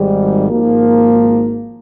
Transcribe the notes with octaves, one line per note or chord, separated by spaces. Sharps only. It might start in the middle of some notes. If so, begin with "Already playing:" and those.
Already playing: G#1 G#2 G3
G#1 G#2 F3 A#3